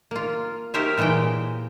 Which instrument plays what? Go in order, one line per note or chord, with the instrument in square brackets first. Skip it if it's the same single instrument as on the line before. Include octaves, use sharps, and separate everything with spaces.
[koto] A#3 F4
D#4 G4 A#4 C5 C#5 E5
A#2 E3 G#3 D#5 G5